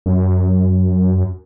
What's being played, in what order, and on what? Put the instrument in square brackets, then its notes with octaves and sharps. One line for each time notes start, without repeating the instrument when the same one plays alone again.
[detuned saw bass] F#2